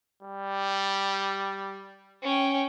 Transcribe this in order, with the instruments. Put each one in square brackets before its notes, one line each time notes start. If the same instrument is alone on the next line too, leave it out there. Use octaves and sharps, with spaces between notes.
[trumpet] G3
[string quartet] C#4 G5